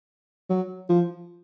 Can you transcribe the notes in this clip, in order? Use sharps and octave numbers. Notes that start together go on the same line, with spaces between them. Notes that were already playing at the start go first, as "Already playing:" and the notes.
F#3
F3